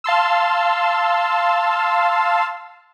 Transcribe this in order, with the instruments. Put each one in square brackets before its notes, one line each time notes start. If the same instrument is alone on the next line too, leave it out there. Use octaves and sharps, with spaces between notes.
[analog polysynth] F5 A5 C6 E6